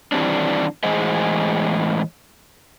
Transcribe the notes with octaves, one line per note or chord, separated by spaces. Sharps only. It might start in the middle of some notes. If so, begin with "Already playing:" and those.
D#3 E3 G3 C4 D4
A2 E3 G#3 G#4 C5 D#5